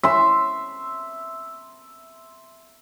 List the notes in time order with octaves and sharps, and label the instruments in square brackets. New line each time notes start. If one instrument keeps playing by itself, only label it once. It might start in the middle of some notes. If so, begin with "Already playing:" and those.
[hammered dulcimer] E5 C6